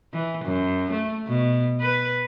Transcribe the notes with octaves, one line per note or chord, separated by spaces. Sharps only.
E3
F#2
A3
B2
B4